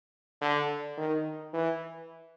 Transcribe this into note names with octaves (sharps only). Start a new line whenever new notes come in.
D3
D#3
E3